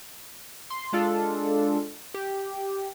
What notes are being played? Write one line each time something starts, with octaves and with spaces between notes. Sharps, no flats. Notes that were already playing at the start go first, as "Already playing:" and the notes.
C6
G#3 D4 F4 A4
G4